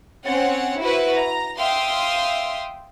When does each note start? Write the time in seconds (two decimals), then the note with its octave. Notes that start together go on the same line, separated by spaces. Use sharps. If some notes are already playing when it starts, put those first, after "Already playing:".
0.25 C4 C#4 C#5 F#5
0.80 E4 F#4 B4 C5
1.12 A#5
1.57 E5 F5 G5 C6 D#6